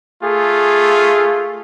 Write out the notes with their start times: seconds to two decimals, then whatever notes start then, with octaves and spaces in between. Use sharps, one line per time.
0.24 A3 F4 G#4